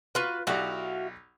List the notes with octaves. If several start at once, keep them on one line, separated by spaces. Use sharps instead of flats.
F4 F#4 B4 C6 F6
B1 E4 F#4 G4 D5 F5